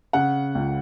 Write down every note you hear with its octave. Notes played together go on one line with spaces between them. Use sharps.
C#3 F#5
C#2